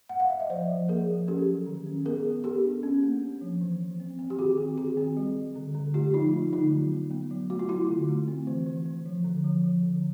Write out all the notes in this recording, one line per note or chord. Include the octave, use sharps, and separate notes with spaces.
F#5
F5
E5
D#5
F3 C5 D5
F3
A#3 G#4 A#4
F3
C#4 G4 A4
F#3
D#3
C#4
B3 G#4 A#4
B3
B3 G4 A4
D4
C#4
A#3
A#3
F3
E3
E3
C4
C4
G4
D#3 F#4 G#4
C4
D#3 F#4 G#4
C4
G3
G3
D3
D3
A3 F4 G4
F3 D#4 F4
A3 D#4
D3 D#4 F4
F#3
B3
B3
F#3
A3 F#4
F4
F#3 E4 F#4
D3
A3
C4
E3
E3
E3
F3
D3
F3
F3
D3